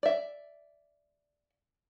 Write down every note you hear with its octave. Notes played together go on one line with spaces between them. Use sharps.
D5 E5